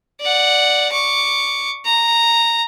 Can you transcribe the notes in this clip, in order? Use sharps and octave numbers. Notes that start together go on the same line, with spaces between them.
D5 F#5
C#6 D6
A#5